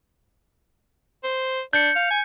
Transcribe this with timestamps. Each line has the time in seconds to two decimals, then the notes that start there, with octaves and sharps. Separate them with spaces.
1.24 C5
1.73 D4 G6 C#7
1.96 F5
2.11 G#5